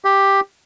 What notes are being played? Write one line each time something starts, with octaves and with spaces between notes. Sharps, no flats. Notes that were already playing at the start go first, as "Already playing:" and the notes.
G4